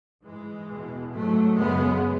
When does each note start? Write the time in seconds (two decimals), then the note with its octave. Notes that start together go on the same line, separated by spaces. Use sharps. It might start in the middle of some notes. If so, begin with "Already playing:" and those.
0.24 G#2 E3 G#3
0.68 E2 B2
1.12 G#2 F#3 A3
1.56 F#2 C#3 G#3 B3